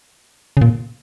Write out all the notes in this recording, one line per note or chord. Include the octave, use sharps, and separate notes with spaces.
C#3
A#2